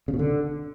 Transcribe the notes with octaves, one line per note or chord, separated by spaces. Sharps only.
C#3
B2
D3